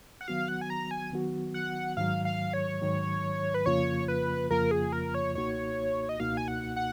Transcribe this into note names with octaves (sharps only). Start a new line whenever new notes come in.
F#5
D#3 F#3 B3 F#4 F5
F#5
G#5
A#5
G#5
D#3 F#3 B3 F#4
F#5
G#2 D#3 F#3 F5
F5
C#5
G#2 D#3 F#3
B4
F2 C#3 F3 A#3 F4 C#5
B4
F2 C#3 F3 A#3 F4 A#4
G#4
A#4
C#5
C#2 B2 A#3 D#4 F#4 C#5
D#5
C#2 B2 A#3 D#4 F#4 F5
G#5
F#5
F#5